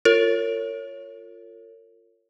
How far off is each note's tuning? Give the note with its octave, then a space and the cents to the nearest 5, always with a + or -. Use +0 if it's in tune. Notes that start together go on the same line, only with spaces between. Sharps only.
F4 +0 A#4 -40 C#5 +0